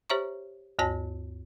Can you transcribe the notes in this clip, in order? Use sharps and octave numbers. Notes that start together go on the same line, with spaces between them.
G4 C5 C#5 E5 A#5 C#6
D2 G2 F#4 C#5 A5 A#6